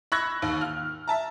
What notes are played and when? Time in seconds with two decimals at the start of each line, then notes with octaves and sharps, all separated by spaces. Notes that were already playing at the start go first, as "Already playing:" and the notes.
0.12 B5 C#6 E6 F#6 G#6 A#6
0.42 D#2
0.61 F6
1.08 E5 A5 A#5